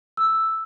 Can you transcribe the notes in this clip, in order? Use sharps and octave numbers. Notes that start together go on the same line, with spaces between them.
E6